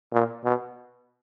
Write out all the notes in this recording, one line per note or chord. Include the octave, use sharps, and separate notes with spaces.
A#2
B2